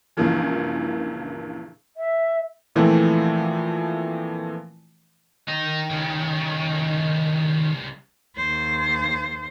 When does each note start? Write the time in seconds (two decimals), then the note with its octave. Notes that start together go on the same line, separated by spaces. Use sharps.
0.17 C#2 G2 A#2 E3 F3
1.96 E5
2.75 A#2 E3 F3 A3 C4 E4
5.48 D#3 D#4
5.90 C2 C#3
8.36 D#2 C5